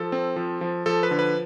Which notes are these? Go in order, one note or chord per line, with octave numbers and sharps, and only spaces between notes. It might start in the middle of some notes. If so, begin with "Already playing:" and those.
Already playing: F3 A4
C4
F3
F3
F3 A4
B4
D3
B4